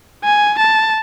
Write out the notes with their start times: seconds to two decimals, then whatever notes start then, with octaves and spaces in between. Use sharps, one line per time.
0.24 G#5
0.59 A5